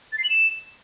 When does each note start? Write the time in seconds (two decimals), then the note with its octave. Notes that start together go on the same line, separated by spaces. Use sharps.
0.12 A6
0.18 C7
0.24 F#7
0.30 E7